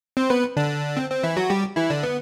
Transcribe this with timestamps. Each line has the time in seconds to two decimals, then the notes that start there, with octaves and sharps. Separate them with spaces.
0.17 C4 C5
0.30 B3 B4
0.57 D3 D4
0.97 C4
1.10 C4
1.23 E3 E4
1.37 F#3 F#4
1.50 G3 G4
1.76 E3 E4
1.90 D3 D4
2.03 B3